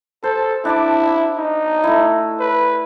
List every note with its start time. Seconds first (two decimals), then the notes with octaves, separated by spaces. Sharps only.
0.23 A4 C5
0.65 D4 E4 A5 D6
1.37 D#4
1.84 A3 E4
2.40 B4